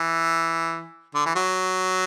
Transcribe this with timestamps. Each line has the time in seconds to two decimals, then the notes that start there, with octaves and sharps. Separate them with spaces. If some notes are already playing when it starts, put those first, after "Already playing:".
Already playing: E3
1.15 D3
1.26 E3
1.35 F#3